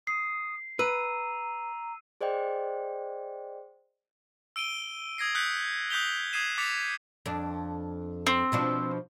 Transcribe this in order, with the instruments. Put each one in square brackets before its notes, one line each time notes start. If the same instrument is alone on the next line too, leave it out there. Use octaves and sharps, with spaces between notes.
[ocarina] D#6 [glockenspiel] C7
[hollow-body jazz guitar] B4 [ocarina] A#5 [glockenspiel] E6 D#7
[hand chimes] G#4 C5 D5 D#5 G5
[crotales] E6 D7 D#7 G7
D#6 G#6 A#6 C7
D#6 E6 F#6 G6 B6 C#7
D#6 F#6 G6 B6 F7 G7
D#6 G#6 B6 C7 D#7 E7
D6 A6 B6 C#7 F7
[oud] F2 D4
[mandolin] C4
[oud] B2 F3 D4